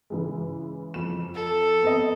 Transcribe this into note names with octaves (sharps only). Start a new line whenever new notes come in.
C#3 E3 G#3
F2 E7
A4
B3 C4 D#5